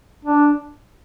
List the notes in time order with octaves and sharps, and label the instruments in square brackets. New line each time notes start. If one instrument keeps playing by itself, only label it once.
[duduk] D4